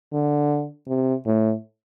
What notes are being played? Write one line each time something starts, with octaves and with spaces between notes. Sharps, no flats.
D3
C3
A2